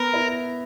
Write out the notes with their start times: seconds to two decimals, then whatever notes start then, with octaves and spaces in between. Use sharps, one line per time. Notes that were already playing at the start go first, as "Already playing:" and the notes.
Already playing: B3 A#4
0.13 E4